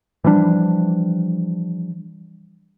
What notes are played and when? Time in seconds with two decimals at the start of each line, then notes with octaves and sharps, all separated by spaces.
0.24 E3 F3 G3 D4